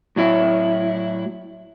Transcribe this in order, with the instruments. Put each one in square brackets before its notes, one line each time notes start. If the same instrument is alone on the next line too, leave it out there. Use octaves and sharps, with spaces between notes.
[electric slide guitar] A2 F#3 E4